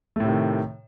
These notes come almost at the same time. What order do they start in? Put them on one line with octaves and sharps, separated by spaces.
A3 A2 C3 D#3